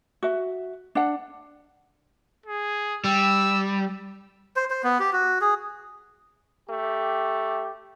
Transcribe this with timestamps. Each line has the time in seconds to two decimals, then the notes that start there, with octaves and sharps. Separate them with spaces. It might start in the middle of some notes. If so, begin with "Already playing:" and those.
0.23 F#4 E5
0.95 D4 F#5
2.46 G#4
3.04 G3 E6
4.56 C5
4.70 C5
4.84 B3
4.99 G4
5.13 F#4
5.41 G#4
6.70 A3 G4